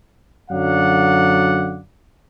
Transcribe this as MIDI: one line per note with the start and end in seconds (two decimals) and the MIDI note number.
0.51 1.80 42
0.51 1.80 50
0.51 1.80 54
0.51 1.80 74
0.51 1.80 77
0.51 1.80 78